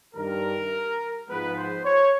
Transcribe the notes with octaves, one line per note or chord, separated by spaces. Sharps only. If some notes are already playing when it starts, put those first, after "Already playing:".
G2 D#3 G3 A#4
G#2 F3 G#3 B3 B4
C5
C#5